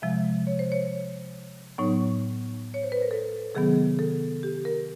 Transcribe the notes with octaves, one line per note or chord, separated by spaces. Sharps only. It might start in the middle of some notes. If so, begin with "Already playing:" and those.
C3 F3 G#3 E5
C#5
C5
C#5
A2 F#3 B3 D#4 C#5
C#5
C5
B4
A#4
A4
C3 D#3 F#3 B3 G#4
A4
G4
A#4